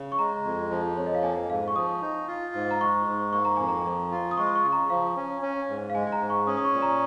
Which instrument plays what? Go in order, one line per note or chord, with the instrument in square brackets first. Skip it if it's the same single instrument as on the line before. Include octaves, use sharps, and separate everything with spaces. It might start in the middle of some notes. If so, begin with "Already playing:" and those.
Already playing: [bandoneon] C#3
[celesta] C#6
[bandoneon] G#3 [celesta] A#5
[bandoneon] F2
F3
[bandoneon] F2 [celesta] C#5
[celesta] D#5
F5
[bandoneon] A#3 [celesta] G#5
[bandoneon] G#2 [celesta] F5
[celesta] C#6
[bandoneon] F3 [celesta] D#6
[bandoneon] D#4
F4
G#2
[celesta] A#5
[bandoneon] G#3 [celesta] C#6
[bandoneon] G#2
[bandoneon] A#3 [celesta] C#6
[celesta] A#5
[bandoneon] F2 [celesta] G#5
[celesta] A#5
[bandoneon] F3
F4
[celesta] D#6
[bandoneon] G#3 [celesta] C#6
[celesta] C#6
[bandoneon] C#3
[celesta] A#5
[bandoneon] F3 [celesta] F5
[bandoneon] C#4
C#4
G#2
[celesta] F5
[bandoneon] G#3 [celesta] G#5
[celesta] G#5
A#5
[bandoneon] G#2
[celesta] C#6
[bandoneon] C#4 [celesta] D#6
[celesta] D#6
C#6
[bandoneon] A#2
[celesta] A#5